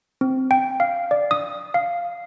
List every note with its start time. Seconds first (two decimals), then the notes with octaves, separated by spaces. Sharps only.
0.21 C4
0.51 G5
0.80 F5
1.11 D5
1.31 D#6
1.74 F5